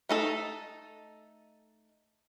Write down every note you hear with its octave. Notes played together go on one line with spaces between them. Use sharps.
A3 D#4 A4